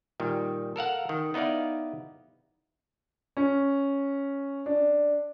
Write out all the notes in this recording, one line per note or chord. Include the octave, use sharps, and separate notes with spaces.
A#2 D#3 G3
A4 A#4 F5 F#5
D#3
B3 D#4 E4 D5 F5
C#4
D4